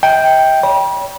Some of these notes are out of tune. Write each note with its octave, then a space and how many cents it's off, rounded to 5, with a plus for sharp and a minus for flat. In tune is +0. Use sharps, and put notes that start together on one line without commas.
D#5 +45 G5 +0
C#5 +40 B5 -40